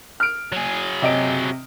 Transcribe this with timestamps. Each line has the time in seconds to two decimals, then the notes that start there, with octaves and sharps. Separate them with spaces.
0.20 F6 D7
0.52 F#3 G#4
1.02 C3 D#5 D7